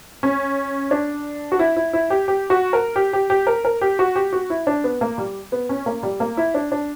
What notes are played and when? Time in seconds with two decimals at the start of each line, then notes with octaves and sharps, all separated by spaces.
0.23 C#4
0.91 D4
1.52 F#4
1.59 E4
1.77 E4
1.93 E4
2.10 G4
2.28 G4
2.50 F#4
2.73 A#4
2.96 G4
3.13 G4
3.30 G4
3.47 A#4
3.65 A#4
3.81 G4
3.99 F#4
4.16 G4
4.33 F#4
4.50 E4
4.67 D4
4.84 B3
5.01 A#3
5.18 G3
5.52 B3
5.69 C#4
5.86 A#3
6.03 G3
6.20 A#3
6.37 E4
6.54 D4
6.72 D4